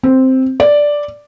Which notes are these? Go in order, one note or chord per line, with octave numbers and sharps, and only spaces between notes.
C4
D5